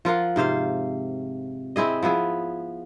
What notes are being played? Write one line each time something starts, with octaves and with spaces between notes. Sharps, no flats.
F3 F4 A#4 F#5
G#2 C3 C5 F5
C4 E4 G#4 D#5
F3 B3 E4 G#4